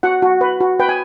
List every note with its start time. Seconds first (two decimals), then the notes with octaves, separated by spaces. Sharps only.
0.03 F#4 F#5
0.22 F#4
0.41 B4
0.60 F#4
0.80 B4 G5
0.89 G#5